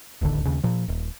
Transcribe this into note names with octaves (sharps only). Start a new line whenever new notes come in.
D1 A1 D#2 D3
D#2 C#3
A#2 F3
D#1